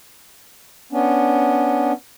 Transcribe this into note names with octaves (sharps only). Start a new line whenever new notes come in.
B3 C#4 D4